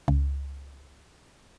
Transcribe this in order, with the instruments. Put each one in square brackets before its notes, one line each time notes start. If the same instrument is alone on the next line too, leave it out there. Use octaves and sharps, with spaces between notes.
[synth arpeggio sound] C#2